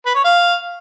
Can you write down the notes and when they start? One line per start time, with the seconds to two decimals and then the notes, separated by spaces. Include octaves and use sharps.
0.06 B4
0.15 C#5
0.24 F5